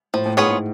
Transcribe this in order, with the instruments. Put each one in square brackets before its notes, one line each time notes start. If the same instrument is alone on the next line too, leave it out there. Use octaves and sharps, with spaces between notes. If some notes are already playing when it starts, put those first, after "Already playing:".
[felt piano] A2 [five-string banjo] F3
[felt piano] A2
[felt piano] G#2 [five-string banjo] B3 F4 G#4 C#5
[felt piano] A2